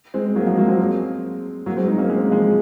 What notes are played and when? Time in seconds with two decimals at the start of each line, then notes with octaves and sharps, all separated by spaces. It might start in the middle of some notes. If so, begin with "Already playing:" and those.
0.14 G#3 C4
0.36 F#3 A#3
0.47 F3 G#3
0.58 F#3 A#3
0.68 G#3 C4
1.66 F#3 A#3
1.77 G#3 C4
1.87 C4 D#4
1.98 A#3 C#4
2.09 G#3 C4
2.31 F3 G#3